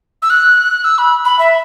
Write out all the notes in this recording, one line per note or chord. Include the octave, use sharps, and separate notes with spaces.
E6
F#6
E6
B5
B5
E5